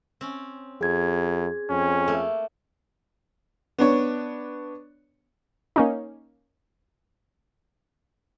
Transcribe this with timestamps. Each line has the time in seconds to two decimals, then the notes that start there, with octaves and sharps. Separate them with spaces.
0.21 C4 C#4
0.81 F2 G#4 G#6
1.70 F2 C#4
2.08 A3 A#3
3.78 B3 D4 C#5
5.76 A#3 C#4 D#4